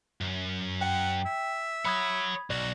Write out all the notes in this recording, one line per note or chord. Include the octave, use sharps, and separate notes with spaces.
F#2
F#5 G5
E5
C#5 F#5 B5 D#6 G#6
B1 F#4 D5